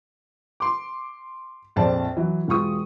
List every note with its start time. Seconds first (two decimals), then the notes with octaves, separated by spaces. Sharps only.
0.60 C6 D6
1.76 A#1 F2 C4 C5 D5 A5
2.17 E3 F#3
2.48 E1 F4 C#6 D#6